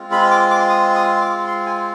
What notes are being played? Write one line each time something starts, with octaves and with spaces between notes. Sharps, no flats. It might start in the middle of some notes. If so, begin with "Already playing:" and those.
Already playing: G#3 C4 F4
B5
D6
D6
D#6
D#6
D6
C6
G#5